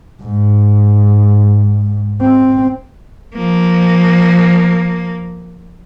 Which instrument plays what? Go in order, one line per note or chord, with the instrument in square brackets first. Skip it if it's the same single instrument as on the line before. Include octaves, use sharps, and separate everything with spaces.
[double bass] G#2
C4
[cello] F3 A#3